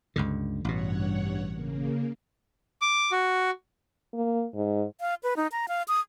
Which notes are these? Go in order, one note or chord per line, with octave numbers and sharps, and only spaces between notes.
C#2 G2 D3
A1 G2 B2 C#5 F#5
C#3 A#3
D6
F#4
A#3
G#2
F5
B4
D#4
A#5
F5
D#6